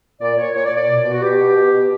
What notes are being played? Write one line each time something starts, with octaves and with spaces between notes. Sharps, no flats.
A#2 D5
A#2 C#5
A#2 C#5
D5
A#2
D5
B2
B2
F#4
B2 G4
B2
B2
B2